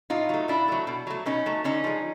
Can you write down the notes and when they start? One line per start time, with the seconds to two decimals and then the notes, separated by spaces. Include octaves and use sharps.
0.10 A2 D#4 F4
0.29 F#3 A3
0.48 A2 D4 E4
0.68 F#3 A3
0.87 B2
1.07 F#3 A3
1.26 B2 C#4 D#4
1.46 F#3 A3
1.64 D3 C#4 D#4
1.84 F3 G#3